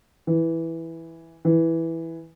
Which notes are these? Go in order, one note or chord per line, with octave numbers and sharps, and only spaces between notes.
E3
E3